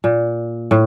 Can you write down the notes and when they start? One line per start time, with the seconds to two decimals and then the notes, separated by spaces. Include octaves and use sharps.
0.04 A#2
0.71 A2